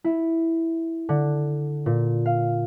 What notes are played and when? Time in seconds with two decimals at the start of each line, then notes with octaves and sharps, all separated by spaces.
0.04 E4
1.09 D3
1.86 A#2
2.26 F5